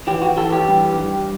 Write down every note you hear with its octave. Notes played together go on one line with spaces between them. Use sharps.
E3 G4
F#4
E3 A4
G4
G2
G2